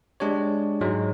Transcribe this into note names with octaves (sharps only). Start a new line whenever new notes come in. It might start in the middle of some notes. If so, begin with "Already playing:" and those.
G#3 D4 G4 C#5
G#2 F#3 G#3